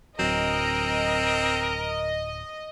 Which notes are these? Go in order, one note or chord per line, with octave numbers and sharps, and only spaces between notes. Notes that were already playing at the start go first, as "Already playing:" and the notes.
D1 F#3 C4 A#4 D#5